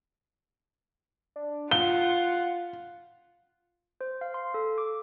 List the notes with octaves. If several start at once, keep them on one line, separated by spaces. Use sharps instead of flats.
D4
F4 F5 F#5 G7
C5
F5
C6
A4
D6